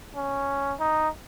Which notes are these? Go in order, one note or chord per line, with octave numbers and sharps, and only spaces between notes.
C#4
D#4